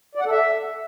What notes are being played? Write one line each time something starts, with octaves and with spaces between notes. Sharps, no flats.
D5
F#5
A4
E5